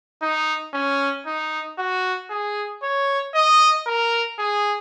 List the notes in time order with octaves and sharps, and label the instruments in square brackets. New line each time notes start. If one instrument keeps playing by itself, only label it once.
[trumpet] D#4
C#4
D#4
F#4
G#4
C#5
D#5
A#4
G#4